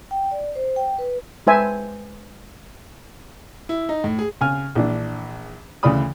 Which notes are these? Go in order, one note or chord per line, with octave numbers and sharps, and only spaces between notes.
G5
D5
C5
G5
B4
G#3 B4 C5 E5 G#5 A5
E4
D#4
A2
G#4
C#3 G#5 F6
A#1 E3 D4
D2 C#3 E3 D5 B5 D#6